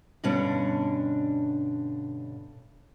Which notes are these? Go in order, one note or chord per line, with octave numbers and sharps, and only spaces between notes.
G2 B2 D3 C#4 D4